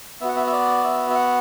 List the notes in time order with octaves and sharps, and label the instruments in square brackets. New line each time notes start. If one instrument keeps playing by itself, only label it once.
[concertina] B3 E5
F#4 F#5
E5
E5
D5
E5
E5
F#5